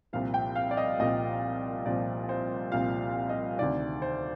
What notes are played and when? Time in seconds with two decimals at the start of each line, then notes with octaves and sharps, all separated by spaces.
0.13 C2 A#2 F3 F5
0.34 G5
0.56 F5
0.71 D5
0.77 D#5
0.99 C2 A#2 F3 D#5
1.85 C2 A#2 F3 D5
2.29 C5
2.72 C2 A#2 F3 F5
3.29 D#5
3.59 D2 C3 D#3 D5
4.02 C5